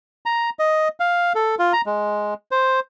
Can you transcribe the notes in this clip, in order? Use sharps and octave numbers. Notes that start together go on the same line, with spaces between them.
A#5
D#5
F5
A4
F4
A#5
G#3
C5